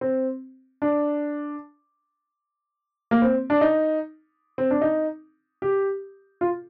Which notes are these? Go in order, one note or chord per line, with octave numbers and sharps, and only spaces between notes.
C4
D4
A#3
C4
D4
D#4
C4
D4
D#4
G4
F4